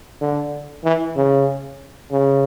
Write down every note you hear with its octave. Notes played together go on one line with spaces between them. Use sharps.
D3
E3
C#3
C#3